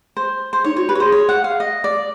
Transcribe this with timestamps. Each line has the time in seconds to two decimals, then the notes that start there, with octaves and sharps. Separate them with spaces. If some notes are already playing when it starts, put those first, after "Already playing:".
0.17 C5
0.53 C5
0.64 D#4 C#5
0.77 F#4 C#5
0.89 G4 B4
0.95 C#5
1.00 G#4 C5
1.12 C#5
1.29 F#5
1.44 F5
1.60 D#5
1.84 D5